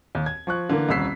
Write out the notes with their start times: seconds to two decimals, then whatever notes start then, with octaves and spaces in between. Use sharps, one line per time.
0.15 D#2
0.26 G#6
0.47 F3 C#6 F#6
0.69 D3 E3 A3 A#3
0.89 D#1 C2 C#4 E6 B6 C7